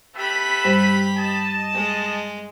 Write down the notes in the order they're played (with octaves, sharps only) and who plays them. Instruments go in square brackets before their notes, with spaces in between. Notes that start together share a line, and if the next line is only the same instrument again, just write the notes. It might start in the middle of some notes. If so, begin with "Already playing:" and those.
[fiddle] G4 B5 [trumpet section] A4 B4 E5
[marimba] G2 G3 C5
[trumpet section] D#5 A5
[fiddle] G#3